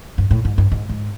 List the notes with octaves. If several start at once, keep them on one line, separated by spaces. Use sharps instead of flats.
G2
A2
G#2
G2
G#2
G#2